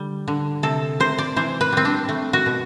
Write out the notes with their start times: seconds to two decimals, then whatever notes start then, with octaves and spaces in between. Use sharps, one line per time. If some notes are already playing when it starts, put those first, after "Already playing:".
Already playing: D3 G3
0.28 D3
0.63 C3 A4
1.00 C3 C5
1.18 D5
1.36 E3 C5
1.61 B4
1.73 G3 C4
1.85 D4
2.09 A3
2.33 F#4
2.46 B2